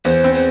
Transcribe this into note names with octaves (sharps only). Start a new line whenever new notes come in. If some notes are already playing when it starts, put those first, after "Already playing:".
E2 C5
C4
C5